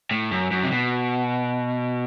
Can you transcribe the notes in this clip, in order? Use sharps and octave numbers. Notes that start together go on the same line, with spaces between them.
A2
F#2
F#2
C3
B2